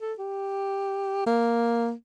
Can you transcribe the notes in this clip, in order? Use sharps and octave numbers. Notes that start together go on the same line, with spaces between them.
A4
G4
A#3